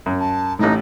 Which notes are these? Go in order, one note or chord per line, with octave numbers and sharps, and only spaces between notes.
F#2
A5
A1 A2 D#4